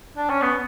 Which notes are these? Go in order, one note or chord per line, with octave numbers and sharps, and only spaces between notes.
D4
C#4
B3